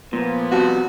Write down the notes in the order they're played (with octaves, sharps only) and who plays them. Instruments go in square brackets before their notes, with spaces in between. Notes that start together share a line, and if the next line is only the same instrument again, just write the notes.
[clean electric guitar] A#2 [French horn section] F3 B3
[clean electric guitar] C3 G3 A5 [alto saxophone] F#4